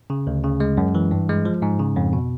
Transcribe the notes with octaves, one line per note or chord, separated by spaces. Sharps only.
C#3
D2
C#3
G#3
F#2
E3
G2
G#3
F3
G#2
C#3
F2
B2